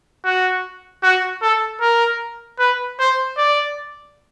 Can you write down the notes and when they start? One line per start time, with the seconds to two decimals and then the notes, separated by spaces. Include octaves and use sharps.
0.24 F#4
1.03 F#4
1.42 A4
1.81 A#4
2.59 B4
2.99 C5
3.37 D5